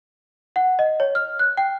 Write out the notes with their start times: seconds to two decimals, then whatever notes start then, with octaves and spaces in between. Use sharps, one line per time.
0.56 F#5
0.79 D#5
1.00 C#5
1.15 F6
1.39 F#6
1.57 G5